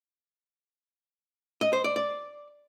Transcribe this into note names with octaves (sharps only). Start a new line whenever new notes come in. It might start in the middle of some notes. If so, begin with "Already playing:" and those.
D#5
C5
D5
D5